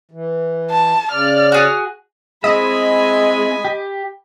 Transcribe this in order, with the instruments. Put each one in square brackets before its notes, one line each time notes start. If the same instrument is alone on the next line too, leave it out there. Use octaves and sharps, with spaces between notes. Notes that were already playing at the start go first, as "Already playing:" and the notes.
[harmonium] E3
[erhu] A5
[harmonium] C#3 D5 [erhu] F6
[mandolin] F#4 G#4
[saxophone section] G#3 [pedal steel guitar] C4 E4 E5 [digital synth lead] D#5 [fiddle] G#5 B5
[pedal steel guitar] G4